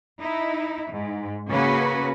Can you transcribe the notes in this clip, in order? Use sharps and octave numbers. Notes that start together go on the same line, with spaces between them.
D#4 E4
G#2
C#3 A#3 C#4 F#4 B4